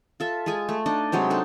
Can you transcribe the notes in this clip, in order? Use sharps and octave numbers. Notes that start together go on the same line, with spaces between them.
F4 A4 E5
G#3 F4 G#4 G#5
A3
D4 D#4 D#5
C3 F#3 G#3 C5
D4 D#4 A4